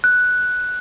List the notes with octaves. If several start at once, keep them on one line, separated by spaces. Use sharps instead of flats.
F#6